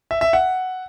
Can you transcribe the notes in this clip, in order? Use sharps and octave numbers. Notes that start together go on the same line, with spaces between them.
E5
E5
F#5